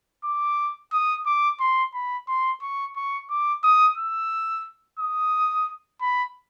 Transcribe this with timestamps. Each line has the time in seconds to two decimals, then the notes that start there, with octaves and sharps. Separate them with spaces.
0.24 D6
0.93 D#6
1.26 D6
1.60 C6
1.94 B5
2.28 C6
2.62 C#6
2.96 C#6
3.30 D6
3.64 D#6
3.98 E6
4.99 D#6
6.01 B5